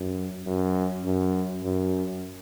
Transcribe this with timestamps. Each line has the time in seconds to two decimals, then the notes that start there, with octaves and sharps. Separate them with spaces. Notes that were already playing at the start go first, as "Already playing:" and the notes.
Already playing: F#2
0.46 F#2
1.04 F#2
1.63 F#2